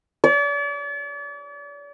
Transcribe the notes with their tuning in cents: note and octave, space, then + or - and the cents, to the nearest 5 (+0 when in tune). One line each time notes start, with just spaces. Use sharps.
D5 -40